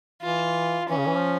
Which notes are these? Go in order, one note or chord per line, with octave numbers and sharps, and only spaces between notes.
E3 F4
E3 C#4
C#3
E3
F3